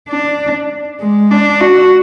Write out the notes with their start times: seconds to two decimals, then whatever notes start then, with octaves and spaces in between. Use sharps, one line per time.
0.09 D4
1.00 G#3
1.31 D4
1.61 F#4